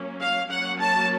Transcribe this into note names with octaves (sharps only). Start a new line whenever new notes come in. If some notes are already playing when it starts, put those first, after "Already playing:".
Already playing: F#3 A#3 C#4
F5
F#3 A#3 C#4 F#5
A5